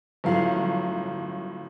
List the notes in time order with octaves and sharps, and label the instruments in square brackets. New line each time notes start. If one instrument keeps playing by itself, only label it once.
[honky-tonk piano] G1 F#2 A2 F3 F5